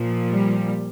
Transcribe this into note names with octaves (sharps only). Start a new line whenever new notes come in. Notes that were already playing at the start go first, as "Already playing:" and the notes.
Already playing: A#2 F3
G3